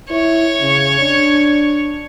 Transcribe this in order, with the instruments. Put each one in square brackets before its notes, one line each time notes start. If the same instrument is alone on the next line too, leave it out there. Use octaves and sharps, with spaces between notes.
[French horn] E4 [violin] C#5
[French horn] C#3
D4